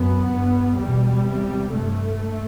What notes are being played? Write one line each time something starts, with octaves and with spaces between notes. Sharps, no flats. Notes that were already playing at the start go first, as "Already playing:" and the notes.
Already playing: F#2 B3
G2
E2 B2 G3
E2 C3
G2 A3